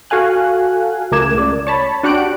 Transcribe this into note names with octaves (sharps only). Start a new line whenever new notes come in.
F#4 A4 F5 G#5 F#6
C#2 A3 A#4 D6 G#6 E7
C#2 D5
C#5 A5 B5
D4 F#4 G4 F#6 D7